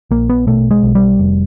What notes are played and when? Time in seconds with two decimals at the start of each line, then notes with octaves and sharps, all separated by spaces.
0.11 A#1 A#3
0.29 B3
0.47 B2 A3
0.71 G#3
0.83 B1
0.95 G3
1.19 F1